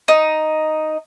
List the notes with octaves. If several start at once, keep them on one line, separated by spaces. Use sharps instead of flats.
D#4